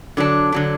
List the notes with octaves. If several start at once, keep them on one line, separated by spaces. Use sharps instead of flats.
D3 F#3 D4
D3 F#3 D4